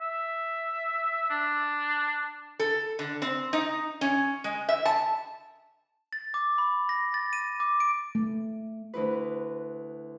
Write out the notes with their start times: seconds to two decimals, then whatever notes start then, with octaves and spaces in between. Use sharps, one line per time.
0.01 E5
1.30 D4
2.59 A4
2.99 D3
3.22 C4
3.53 D#4
4.01 C#4
4.44 G#3
4.69 E5
4.85 A5
6.13 A6
6.34 D6
6.58 B5
6.89 A#6
7.14 A6
7.33 D#7
7.60 D6
7.80 D7
8.15 A3
8.94 D2 E4 B4